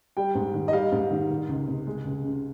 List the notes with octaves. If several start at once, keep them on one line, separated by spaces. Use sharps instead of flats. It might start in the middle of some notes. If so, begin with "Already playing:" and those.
G3 G5
G#2
D#3
D#5
G3 F5
G#2
D#3
D#3
C#2
C3
G#3
C#2
C#3